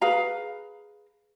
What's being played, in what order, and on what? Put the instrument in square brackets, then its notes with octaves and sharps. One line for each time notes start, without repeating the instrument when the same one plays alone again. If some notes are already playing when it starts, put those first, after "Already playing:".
[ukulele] G#4 B4 F5 A#5